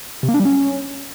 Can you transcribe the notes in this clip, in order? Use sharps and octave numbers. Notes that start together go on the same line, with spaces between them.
C3
A#3
D4
G3
C#4